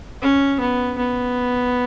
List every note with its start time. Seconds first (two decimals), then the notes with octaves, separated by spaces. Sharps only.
0.22 C#4
0.60 B3
0.98 B3